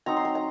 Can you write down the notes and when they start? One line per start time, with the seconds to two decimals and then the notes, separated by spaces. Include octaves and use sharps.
0.06 F#3 C4 D#4 A#5
0.17 C6
0.25 A#5
0.35 A#5